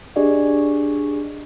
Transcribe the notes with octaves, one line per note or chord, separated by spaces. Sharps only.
D4 G4 G#4 D5 D#5